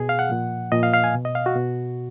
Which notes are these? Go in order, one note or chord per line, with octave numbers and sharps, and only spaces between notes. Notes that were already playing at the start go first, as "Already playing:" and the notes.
Already playing: B2 G#4
F5
F#5
A#2 F3
A#2 F3 D#5
F5
F5
G#5
B2
D#5
F5
F#4
B2